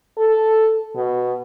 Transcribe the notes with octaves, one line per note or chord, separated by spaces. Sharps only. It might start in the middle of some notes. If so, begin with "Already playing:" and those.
A4
B2